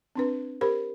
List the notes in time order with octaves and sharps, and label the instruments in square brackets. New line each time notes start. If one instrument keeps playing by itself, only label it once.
[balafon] C4 D4 B4
G4 A#4 C5 B5